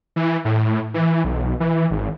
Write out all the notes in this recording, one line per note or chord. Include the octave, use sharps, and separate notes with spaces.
E3
A2
E3
B1
E3
G#1